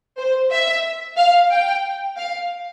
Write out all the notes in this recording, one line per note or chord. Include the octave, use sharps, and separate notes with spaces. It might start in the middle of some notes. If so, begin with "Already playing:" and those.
C5
E5
F5
G5
F5